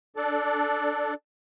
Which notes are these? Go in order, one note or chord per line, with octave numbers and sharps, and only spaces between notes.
D4 A4 D5